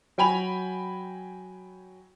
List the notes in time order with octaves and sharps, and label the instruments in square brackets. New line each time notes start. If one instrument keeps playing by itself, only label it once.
[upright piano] F#3 G5 G#5 B5 F7